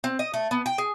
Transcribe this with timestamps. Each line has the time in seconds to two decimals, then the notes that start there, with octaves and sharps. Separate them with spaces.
0.04 C4
0.19 D#5
0.34 A3
0.51 B3
0.66 G5
0.78 G#4